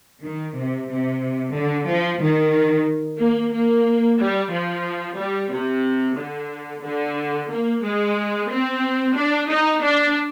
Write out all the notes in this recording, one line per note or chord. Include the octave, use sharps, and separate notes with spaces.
D#3
C3
C3
D3
F3
D#3
A#3
A#3
G3
F3
G3
C3
D3
D3
A#3
G#3
C4
D4
D#4
D4